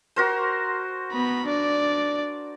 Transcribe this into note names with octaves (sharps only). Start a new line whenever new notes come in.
F#4 A#4 C5
B3 B5
D4 D5